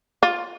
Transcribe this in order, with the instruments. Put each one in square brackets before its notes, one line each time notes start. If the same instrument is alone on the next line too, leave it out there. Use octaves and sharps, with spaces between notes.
[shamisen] F4